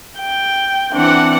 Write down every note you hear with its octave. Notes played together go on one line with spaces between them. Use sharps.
G5
E3 C4 D4 F#5